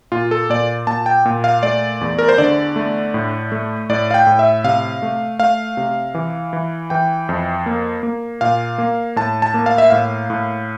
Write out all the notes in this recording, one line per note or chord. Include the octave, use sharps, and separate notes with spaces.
A#2 F4
A4
A#2 D5
A#2 A5
G5
A#2
F5
A3 D5
E2
A#4
C5
D3 D5
A3
A2
A3
A2 D5
F5
G5
A2
E5
C3 F5
A3
A3 F5
C3
E3
E3
E3 G5
F2
A#3
A#3
A#2 F5
A#3
A2 A5
A5
A#3
F5
E5
A2 F5
A2